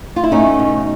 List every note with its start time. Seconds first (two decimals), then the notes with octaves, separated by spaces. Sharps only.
0.16 F4
0.24 E4
0.31 A3 C#4 D#4
0.59 B2